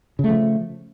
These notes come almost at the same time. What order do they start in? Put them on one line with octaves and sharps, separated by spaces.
C#3 A3 F3